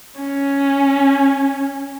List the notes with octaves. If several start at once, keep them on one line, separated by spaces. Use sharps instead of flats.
C#4